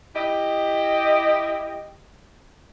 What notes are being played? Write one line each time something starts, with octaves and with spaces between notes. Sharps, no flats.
E4 G4 D#5